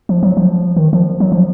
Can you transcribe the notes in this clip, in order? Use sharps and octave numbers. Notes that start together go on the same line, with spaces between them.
F3
F#3
F3
D#3
F3
F#3
F3